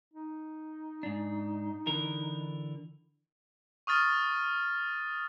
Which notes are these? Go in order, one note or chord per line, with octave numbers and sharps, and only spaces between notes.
D#4
G#2 D4
D3 E3 A#4
C#6 D#6 F6 A6